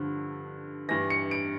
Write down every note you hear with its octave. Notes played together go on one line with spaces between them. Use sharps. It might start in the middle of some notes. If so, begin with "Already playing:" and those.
Already playing: G2 D3 F3
G2 E3 A#6
C#7
D7